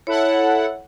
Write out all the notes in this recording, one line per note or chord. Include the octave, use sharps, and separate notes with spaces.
E4 A4 C#5 F#5